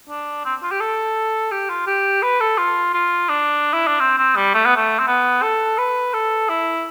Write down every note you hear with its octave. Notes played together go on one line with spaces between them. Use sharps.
D4
C4
F4
G4
A4
G4
F4
G4
B4
A4
F4
F4
D4
E4
D4
C4
C4
G3
A3
B3
A3
C4
B3
A4
B4
A4
E4